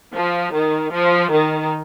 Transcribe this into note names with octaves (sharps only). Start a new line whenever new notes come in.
F3
D#3
F3
D#3